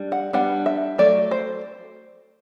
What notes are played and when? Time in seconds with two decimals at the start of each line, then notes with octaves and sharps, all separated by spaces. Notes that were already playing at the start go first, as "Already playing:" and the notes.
Already playing: G3 D4
0.12 F#5
0.33 G3 B3 D4 F#5
0.66 E5
0.98 F#3 A3 D5
1.31 C5